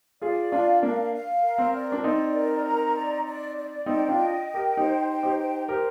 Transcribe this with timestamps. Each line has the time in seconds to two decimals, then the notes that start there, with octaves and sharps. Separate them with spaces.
0.22 F4 G#4 D5
0.52 D4 F4 F5
0.82 A#3 D4 F5
1.13 F5
1.43 A#4
1.58 C4
1.74 D5
1.92 D4
2.04 C4 D#4 D5
2.34 A#4
2.65 A#5
2.95 D5
3.25 D5
3.56 D5
3.86 C4 D#4 G5
4.09 D4 F4
4.17 D#5
4.47 G5
4.54 G4 A#4
4.77 D#4 G4 C5
5.08 G5
5.23 D#4 G4
5.38 C5
5.68 G4 A#4 C5